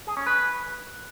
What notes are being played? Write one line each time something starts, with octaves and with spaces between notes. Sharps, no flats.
G#4
C#4
B4